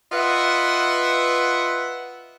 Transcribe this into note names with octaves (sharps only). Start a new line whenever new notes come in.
F4 B4 D#5 E5 F#5